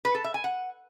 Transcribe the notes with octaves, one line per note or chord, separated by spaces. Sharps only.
B4
A4
E5
G#5
F#5